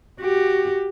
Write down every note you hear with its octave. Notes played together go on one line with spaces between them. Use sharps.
F#4 G4